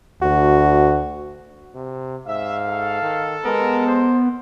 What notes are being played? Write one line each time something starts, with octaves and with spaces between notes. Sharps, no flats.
D2 F#4
C3
G#2 E5 F5
A4
D#3
G#3 B3 A#4
C5